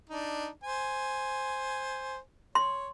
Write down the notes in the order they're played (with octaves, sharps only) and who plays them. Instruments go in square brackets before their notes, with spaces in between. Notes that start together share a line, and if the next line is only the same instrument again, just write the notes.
[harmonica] D4 D#4
C5 G#5
[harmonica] C#5 [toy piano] C6